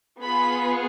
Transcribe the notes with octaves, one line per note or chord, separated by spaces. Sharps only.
B3 F4 G#4 B5